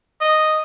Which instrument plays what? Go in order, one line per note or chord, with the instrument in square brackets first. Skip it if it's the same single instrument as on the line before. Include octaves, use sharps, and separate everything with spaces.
[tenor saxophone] D#5